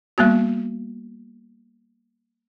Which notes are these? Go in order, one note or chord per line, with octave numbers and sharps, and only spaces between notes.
G3 A#3 B3 F#4